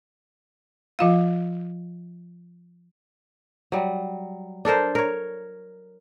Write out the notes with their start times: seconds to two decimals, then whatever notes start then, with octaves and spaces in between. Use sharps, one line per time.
0.99 F3 F4 F5
3.72 F#3 G3
4.65 D4 A4 A#4 C5
4.95 A#4 C#5